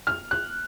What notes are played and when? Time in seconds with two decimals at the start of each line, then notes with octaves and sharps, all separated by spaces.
0.07 F6
0.31 F#6